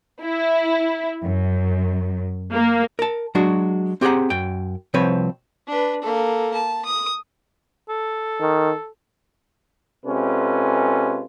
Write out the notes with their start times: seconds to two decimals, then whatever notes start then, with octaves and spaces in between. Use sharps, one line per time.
0.22 E4
1.24 F#2
2.53 A#3
2.99 A#4 A5
3.35 F#3 G#3 D4 F#4
4.01 C4 G4 G#4 F#5 A#5
4.30 F#2 G5
4.94 C2 F3 C4 B4 C#5
5.67 D4 B4
6.01 A#3 A4
6.54 A5
6.85 D#6
7.89 A4
8.41 D#3
10.06 C3 G#3 C#4 F4 A4 B4